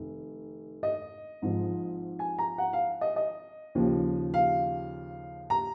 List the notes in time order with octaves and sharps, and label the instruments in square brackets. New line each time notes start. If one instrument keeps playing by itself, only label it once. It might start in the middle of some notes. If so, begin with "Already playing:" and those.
Already playing: [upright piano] F1 D#3
D#5
G#1 G#2 F3
G#5
A#5
F#5
F5
D#5
D#5
D#2 C#3 F3
F5
A#5